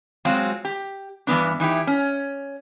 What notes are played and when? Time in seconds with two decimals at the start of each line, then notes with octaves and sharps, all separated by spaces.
0.25 F#3 G#3 C4 F4 F#4
0.65 G4
1.27 G2 E3 B3 D4
1.60 E3 D#4 E4 G4
1.87 C#4